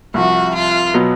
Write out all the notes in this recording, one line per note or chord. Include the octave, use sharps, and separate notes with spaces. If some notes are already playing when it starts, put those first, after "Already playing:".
C2 C3 F3 F#4
F4
B2 F#3 B3